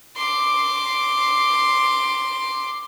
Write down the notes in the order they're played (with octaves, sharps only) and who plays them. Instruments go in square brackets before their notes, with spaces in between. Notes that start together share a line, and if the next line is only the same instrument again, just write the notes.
[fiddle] C6 D6